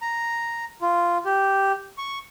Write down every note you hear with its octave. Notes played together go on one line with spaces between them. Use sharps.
A#5
F4
G4
C#6